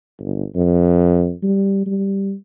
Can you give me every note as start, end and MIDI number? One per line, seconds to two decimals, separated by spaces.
0.20 0.44 31
0.55 1.33 41
1.43 1.84 55
1.87 2.34 55